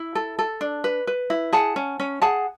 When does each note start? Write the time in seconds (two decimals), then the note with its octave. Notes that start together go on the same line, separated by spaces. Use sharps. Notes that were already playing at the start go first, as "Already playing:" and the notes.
Already playing: E4
0.15 A4
0.39 A4
0.61 D4
0.84 B4
1.07 B4
1.30 E4
1.53 G#4 F#5 A5
1.76 C#4
2.00 C#4
2.22 G#4 F#5 A5